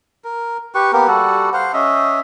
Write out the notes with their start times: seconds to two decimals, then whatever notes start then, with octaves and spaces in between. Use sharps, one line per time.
0.24 A#4
0.75 G4 B4 C#6
0.93 A#3 B3 G4 A#4
1.08 G3 F#4 A4 F#5
1.53 C5 F5 F#5
1.74 C#4 D#5 E5